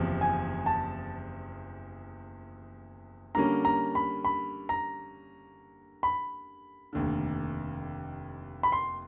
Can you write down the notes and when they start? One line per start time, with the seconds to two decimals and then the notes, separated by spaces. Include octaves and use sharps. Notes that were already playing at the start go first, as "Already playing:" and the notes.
Already playing: F#1 E2 C3 F3
0.21 G#5
0.66 A5
3.35 D3 G3 A#3 C#4 A#5
3.65 A#5
3.95 B5
4.25 B5
4.69 A#5
6.03 B5
6.93 F1 D#2 D3
8.63 B5
8.72 C6